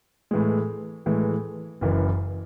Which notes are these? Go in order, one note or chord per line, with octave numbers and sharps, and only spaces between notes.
A2 E3 G#3
A2 E3 G#3
F#1 F#2 E3